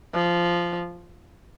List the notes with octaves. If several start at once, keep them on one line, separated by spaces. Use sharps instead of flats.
F3